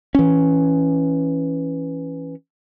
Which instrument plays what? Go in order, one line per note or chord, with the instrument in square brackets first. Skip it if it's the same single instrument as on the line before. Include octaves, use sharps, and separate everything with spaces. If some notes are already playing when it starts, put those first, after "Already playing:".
[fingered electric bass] E3 C#4